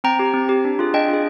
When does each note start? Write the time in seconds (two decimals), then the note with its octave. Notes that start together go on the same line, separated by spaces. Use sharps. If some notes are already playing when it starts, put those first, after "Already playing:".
0.04 C4 G5 A#5
0.19 G4
0.34 C4
0.49 G4
0.65 D4
0.79 F4 G#4
0.94 D4 D#5 G5
1.08 F4
1.14 G#4